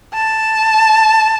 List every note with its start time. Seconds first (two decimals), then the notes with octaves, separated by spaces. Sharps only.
0.14 A5